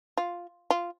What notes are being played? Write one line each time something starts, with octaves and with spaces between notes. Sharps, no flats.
F4
F4